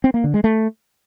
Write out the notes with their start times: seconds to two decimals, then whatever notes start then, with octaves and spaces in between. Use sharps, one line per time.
0.04 C4
0.14 A#3
0.24 D3
0.34 G#3
0.44 A3